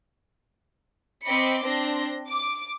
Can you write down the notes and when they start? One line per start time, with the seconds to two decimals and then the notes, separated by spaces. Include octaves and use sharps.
1.25 C4 D#5 G5 B5 D6 C#7
1.63 C4 D4 C6 A#6
2.30 D6